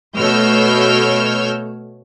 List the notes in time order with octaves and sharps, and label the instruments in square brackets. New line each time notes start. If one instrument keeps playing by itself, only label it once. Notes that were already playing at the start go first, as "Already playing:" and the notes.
[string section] B2 A3 C#5 E6 F6 G6